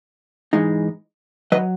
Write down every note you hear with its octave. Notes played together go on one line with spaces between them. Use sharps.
G#2 E3 G#3 D#4
D#3 F#3 B4 D#5